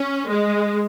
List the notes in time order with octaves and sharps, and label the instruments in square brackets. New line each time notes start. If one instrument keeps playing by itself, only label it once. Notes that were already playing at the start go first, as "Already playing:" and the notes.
Already playing: [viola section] C#4
G#3